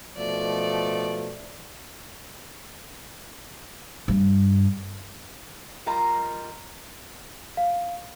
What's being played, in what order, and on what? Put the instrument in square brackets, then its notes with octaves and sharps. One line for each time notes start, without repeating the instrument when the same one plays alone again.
[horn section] B2 F3 A3 [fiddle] D5
[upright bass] G2
[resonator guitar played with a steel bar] G3 F4 A#4 D#5 A#5
[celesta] F5